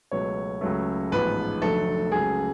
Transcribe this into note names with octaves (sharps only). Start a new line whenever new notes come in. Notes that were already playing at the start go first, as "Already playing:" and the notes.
C#2 B2 F#3 A3 C#5
C#2 C#3 F#3 A3
A1 G#2 F3 B3 B4
F1 F2 D3 F#3 A3 A4
C#2 C#3 F#3 A3 G#4